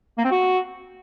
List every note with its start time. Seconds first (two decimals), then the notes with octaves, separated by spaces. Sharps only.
0.18 A#3
0.25 C4
0.31 F#4